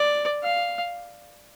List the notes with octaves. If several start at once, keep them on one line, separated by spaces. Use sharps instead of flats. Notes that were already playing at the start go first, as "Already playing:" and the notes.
Already playing: D5
F5